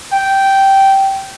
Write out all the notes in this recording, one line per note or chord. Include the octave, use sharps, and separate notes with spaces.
G5